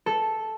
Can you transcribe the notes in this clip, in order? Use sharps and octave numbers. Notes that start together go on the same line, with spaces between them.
A4